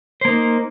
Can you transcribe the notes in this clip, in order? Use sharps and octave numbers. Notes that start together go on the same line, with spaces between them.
A#3 D#4 C5